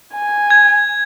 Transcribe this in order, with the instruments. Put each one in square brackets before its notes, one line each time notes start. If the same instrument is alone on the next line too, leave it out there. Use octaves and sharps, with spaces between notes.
[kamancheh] G#5
[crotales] G#6